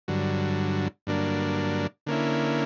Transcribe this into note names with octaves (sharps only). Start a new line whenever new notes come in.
G2 D3 F#3
G2 D3 F#3 A#3 D4
D3 A#3 C#4 E4